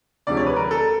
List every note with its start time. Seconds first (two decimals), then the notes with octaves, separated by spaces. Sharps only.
0.27 D2 C3 F3 G#3 D5
0.37 C#5
0.46 B4
0.56 A#4
0.71 A4